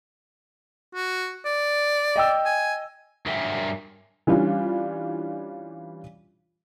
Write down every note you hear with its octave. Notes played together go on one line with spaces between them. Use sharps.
F#4
D5
D#5 G5 E6
G#5
G2 F#3 A#4 E5 G5 G#5
E3 G3 C#4 D4 F4